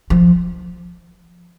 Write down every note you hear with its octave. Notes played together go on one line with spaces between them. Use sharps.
F3